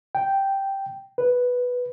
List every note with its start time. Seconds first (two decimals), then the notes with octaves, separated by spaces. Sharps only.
0.15 G5
1.18 B4